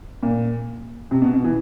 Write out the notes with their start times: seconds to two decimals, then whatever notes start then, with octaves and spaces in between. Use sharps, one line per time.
0.23 A#2
1.11 C3
1.22 B2
1.33 B2
1.44 E3